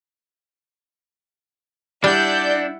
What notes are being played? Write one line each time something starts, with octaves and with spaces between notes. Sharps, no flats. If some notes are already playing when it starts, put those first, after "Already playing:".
G3 D4 E4 D5 F#5 G6